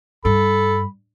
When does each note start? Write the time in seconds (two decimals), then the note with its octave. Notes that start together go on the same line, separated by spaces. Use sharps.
0.25 G2 A4 B5